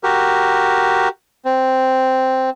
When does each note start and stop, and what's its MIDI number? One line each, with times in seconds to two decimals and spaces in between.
0.03 1.08 66
0.03 1.08 67
0.03 1.08 70
1.45 2.50 60